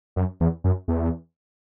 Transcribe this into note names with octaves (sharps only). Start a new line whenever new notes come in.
F#2
E2
F#2
E2